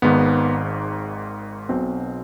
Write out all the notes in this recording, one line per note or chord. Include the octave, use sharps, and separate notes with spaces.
G#1 G#2 D#3 B3
B1 B2 C4